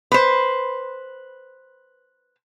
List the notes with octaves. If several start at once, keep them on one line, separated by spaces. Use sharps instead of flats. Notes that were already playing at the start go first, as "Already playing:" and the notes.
B4 C5